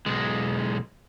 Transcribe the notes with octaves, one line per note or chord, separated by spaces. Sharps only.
B1 G#3